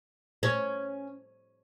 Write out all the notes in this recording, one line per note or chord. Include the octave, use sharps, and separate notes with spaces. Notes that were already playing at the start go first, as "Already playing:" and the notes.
C#4